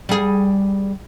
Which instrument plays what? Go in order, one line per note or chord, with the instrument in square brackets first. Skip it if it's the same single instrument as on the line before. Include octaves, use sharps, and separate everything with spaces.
[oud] G3 G#4